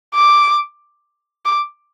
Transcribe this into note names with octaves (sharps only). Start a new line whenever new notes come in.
D6
D6